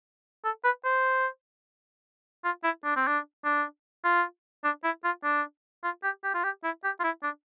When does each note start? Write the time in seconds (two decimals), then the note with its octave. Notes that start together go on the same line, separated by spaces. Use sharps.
0.44 A4
0.64 B4
0.84 C5
2.44 F4
2.64 E4
2.84 D4
2.96 C4
3.07 D4
3.45 D4
4.04 F4
4.64 D4
4.84 E4
5.04 F4
5.24 D4
5.83 F4
6.03 G4
6.24 G4
6.34 F4
6.43 G4
6.64 E4
6.84 G4
6.99 F4
7.04 E4
7.23 D4